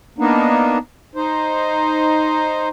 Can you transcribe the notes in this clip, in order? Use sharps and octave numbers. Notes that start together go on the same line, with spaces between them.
A#3 B3 D4 D#4
D#4 C5